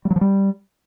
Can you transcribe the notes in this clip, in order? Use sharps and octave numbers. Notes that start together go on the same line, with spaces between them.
G3
F#3
F3
G3